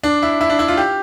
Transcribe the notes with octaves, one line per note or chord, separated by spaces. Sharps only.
D4
E4
E4
D4
E4
F4
G4